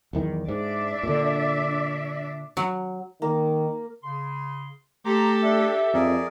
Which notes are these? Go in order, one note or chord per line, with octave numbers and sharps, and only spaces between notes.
B1 E2 D#3
G#2 D4 D5 E5
A#2 D3
F#3
D#3 A#3
C#3 C6
A3 G4 A4 A#5 C6 D6
D4 E5
F2 G#4 A#4 D5